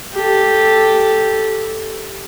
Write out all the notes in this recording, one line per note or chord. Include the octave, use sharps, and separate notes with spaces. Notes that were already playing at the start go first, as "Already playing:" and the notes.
G4 A4